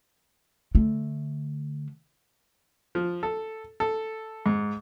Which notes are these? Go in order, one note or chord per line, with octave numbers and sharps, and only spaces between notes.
D3 A3
F3
A4
A4
G#2